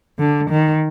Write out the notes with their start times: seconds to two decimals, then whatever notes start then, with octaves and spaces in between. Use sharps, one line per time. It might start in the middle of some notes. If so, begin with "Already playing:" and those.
0.19 D3
0.50 D#3